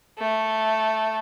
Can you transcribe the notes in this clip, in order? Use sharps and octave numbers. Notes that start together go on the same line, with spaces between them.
A3